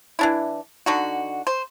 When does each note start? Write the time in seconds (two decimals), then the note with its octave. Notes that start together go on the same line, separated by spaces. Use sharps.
0.19 E3 D4 E4
0.86 D3 D#4 F#4
1.47 C5